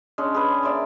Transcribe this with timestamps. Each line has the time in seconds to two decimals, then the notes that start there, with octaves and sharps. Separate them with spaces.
0.18 G#3 C#4 D4
0.34 G#4 B4
0.63 A#3 D5 E5 C6